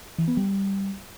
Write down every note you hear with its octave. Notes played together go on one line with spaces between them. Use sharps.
E3
B3
G3